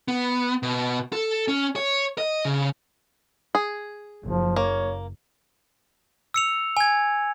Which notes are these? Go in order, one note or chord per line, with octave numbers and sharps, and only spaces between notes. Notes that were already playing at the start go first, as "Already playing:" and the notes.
B3
B2
A4
C#4
C#5
D#5
C#3
G#4
F#1 F3
A#3 C#5
E6 C#7 F7
G#5 G#6